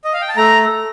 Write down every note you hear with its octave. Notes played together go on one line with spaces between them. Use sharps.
D#5
F5
G5
A5
A3 A#5